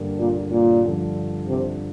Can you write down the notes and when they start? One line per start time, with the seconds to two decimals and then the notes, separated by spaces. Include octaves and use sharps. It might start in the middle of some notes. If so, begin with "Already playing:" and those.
Already playing: G2 D3 A#3 G4
0.18 A#2
0.51 A#2
0.83 G2 D3 F3
1.48 C3